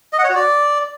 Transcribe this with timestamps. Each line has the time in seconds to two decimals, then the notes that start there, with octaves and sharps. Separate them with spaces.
0.13 D#5
0.19 F#5
0.24 C#5
0.30 F#4
0.35 D5